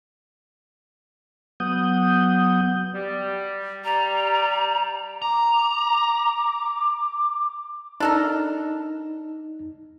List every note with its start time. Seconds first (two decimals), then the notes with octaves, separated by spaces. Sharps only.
1.60 F#3 B3 F#5 D#6 G6
2.95 G3
3.84 G3 A#5
5.22 A#5 D6
8.00 D4 D#4 A4 A#4